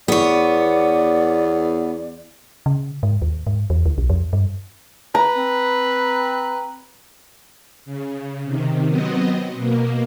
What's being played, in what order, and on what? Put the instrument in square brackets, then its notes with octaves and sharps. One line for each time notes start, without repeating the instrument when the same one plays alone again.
[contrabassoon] E2 [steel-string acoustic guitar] B3 C#5 [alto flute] D5
[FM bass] C#3
G#2
D#2
G#2
E2
D2
B1
F2
G2
[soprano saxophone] B4 [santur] A#5
[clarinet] C4
[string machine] C#3
C3 D#3
F#3 B3 C4 D#5
B2 A#3